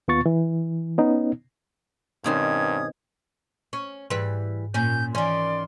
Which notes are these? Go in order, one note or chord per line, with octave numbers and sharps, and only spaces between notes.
D#2 B3 F4 C#6 A6
E3
B3 C#4 D#4
G2 B2 D#3 C4 C#4 D#6 G#6
C#4 C#6
G#2 E3 G3 B4
A#2 C#4 G6
D#3 E3 C#4 D5 C6